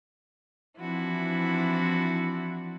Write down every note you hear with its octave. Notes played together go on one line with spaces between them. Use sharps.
E3 F3 C4 D4 E4 F#4